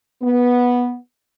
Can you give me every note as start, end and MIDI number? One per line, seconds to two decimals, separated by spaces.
0.22 0.96 59